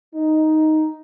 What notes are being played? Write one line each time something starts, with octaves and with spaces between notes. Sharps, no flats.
D#4